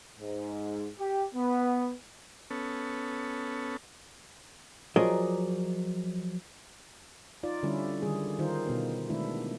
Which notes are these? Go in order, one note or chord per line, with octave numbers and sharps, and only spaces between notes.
G#2
G4
B3
B3 C#4 A4
F3 F#3 G#4 A#4 D5 D#5
D#4 F4 D5
D3 G3 C#4 E4
D3 D#3 G3 G#4
D#3 D#4 F4 C5
B2 B3
D#3 G#3 A3 B3 D4 E4